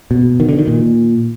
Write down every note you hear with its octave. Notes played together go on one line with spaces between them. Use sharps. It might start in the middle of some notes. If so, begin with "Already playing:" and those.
B2
D#3
D3
D#3
A#2